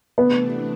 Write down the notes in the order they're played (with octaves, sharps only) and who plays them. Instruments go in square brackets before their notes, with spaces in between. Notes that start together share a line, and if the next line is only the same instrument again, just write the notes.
[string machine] C3 E3 A3 D4 [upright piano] B3